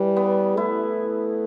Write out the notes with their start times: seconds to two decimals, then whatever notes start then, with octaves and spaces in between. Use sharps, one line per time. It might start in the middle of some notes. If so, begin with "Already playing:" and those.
Already playing: E3 G3
0.17 B3
0.57 A3 E4